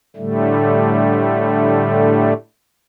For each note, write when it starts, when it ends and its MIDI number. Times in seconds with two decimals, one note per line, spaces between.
0.17 2.33 45
0.17 2.33 50
0.17 2.33 55
0.17 2.33 57